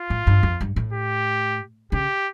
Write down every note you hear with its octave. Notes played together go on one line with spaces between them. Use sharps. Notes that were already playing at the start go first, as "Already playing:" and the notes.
Already playing: F4
A2
G2
F2
G2
A2
G4
C#3 G4